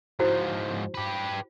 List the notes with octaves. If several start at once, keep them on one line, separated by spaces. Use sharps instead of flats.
G#2 F3 E4 F#4 C5
G4 B4